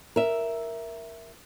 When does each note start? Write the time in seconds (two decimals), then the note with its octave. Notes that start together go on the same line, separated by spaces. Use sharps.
0.16 A#4 E5